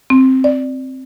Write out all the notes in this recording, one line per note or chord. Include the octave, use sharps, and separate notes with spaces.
C4
D5